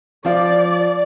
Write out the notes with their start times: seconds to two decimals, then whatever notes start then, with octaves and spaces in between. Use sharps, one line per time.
0.25 F3 F4 D5